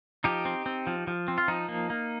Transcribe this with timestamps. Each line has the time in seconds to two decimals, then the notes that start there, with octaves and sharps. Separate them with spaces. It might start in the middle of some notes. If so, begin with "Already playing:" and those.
0.24 F3 D#4 G4
0.45 C4
0.66 C4
0.87 F3
1.07 F3
1.28 C4
1.38 F4
1.48 F3 D#4
1.69 A#3
1.90 A#3